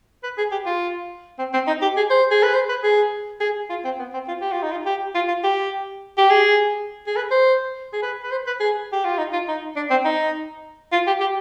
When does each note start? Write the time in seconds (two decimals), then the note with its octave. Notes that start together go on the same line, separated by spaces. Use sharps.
0.24 B4
0.38 G#4
0.51 G4
0.66 F4
1.39 C4
1.54 C4
1.68 D#4
1.82 G4
1.97 G#4
2.10 C5
2.31 G#4
2.43 B4
2.54 C5
2.69 B4
2.84 G#4
3.40 G#4
3.70 F4
3.85 C4
3.99 B3
4.14 C4
4.28 F4
4.41 G4
4.52 F4
4.63 D#4
4.71 F4
4.86 G4
5.15 F4
5.28 F4
5.44 G4
6.18 G4
6.30 G#4
7.07 G#4
7.16 B4
7.31 C5
7.93 G#4
8.03 B4
8.23 B4
8.31 C5
8.47 B4
8.60 G#4
8.93 G4
9.05 F4
9.18 D#4
9.33 F4
9.48 D#4
9.76 D4
9.90 C4
10.05 D#4
10.92 F4
11.07 G4
11.21 G4